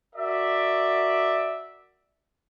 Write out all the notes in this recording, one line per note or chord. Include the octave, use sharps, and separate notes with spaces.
F#4 A#4 D5 E5